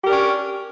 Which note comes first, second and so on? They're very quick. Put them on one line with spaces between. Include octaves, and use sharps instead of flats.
G4 A#4 D4 C#4